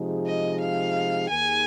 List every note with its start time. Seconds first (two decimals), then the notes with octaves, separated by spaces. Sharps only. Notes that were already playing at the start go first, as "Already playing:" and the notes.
Already playing: C3 F3 G#3 D#4 G#4
0.27 D#5
0.61 F5
1.30 D#2 D#3 A#3 G#4 G#5